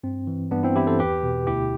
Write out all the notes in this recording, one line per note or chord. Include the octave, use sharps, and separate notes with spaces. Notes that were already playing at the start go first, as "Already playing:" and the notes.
G2 C4
E3
G2 B3 D4
C4 E4
E3 E4 G4
A4 C5
E2 G4 B4
B2
D2 E4 G4